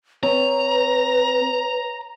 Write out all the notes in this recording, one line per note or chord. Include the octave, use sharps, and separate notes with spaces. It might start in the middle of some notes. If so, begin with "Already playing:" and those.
C4 B4 C#5 A#5